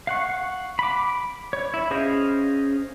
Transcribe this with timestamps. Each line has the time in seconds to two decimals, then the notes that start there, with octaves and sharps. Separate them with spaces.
0.07 F5 F#5 C#6
0.79 B5 D6
1.53 C#5
1.74 E4
1.91 C#4 G#4 C5 D#5 F5